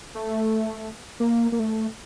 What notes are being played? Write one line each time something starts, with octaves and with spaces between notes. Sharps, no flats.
A3
A#3
A#3
A3